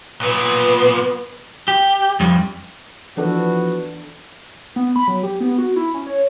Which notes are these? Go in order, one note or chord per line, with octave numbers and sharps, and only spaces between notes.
B1 A#2 B3
G4
F2 G3
E3 F3 B3 D4 F#4 A4
B3
B5
F#3
G4
B3
F#4
E4
C#4
C#5